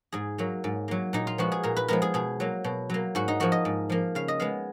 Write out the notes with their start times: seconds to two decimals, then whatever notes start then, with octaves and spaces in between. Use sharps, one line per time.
0.12 G#2 G#4
0.38 F#3 A#3
0.64 G#2
0.88 F#3 A#3
1.13 A#2 D#4
1.27 F4
1.38 F3 G#3 B3 F#4
1.52 G#4
1.63 A#2 A#4
1.77 B4
1.88 F3 G#3 B3 A#4
2.02 G#4
2.14 B2 G#4
2.40 F#3 A#3
2.64 B2
2.90 F#3 A#3
3.15 G#2 F#4
3.28 D#4
3.40 F3 A#3 F#4
3.52 D#5
3.65 G#2
3.90 F3 A#3
4.15 C#3 F5
4.28 D#5
4.40 G#3 B3 F5